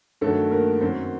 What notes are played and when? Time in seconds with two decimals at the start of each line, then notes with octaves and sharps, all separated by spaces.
0.21 G2 D#3 F#3 A3 A4
0.51 A#3 A#4
0.81 F#2 D#3 F#3 C4 C5